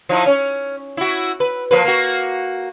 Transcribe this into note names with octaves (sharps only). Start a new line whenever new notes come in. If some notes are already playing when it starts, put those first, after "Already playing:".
F3 D#4 E4
C#4
E4 F#4
B4
F3 A#3 B4
A#3 F#4